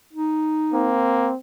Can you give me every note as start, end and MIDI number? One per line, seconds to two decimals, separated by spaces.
0.13 0.93 63
0.73 1.31 58
0.73 1.36 60